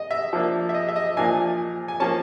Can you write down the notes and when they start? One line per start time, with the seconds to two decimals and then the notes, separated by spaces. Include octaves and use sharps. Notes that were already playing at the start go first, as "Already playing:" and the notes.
Already playing: D#5
0.11 E5
0.33 F3 A#3 D4
0.69 E5
0.74 D#5
0.88 E5
0.96 D#5
1.17 A#2 F3 A#3 D4 G#5
1.88 G#5
2.00 F3 A#3 C#4 A5